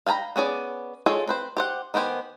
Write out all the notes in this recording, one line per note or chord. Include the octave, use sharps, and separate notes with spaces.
F5 G5 G#5 A#5 B5
B3 C#4 G#4 D5
G#3 F4 G#4 A4 C#5
C4 B4 C5
G4 C5 F#5
D#3 B3 G4 C5 G#5